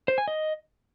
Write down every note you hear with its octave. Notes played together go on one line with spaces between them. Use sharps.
C5
G#5
D#5